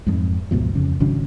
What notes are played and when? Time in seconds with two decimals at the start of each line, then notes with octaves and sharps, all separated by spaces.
0.07 F2 G#2
0.51 D2 G#2 B2 F3
0.75 F2 C#3
1.00 G#1 C#3 F#3 D4